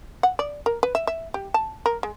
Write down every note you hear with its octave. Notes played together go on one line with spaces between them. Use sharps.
F#5
D5
A#4
B4
E5
E5
G4
A5
A#4
G#3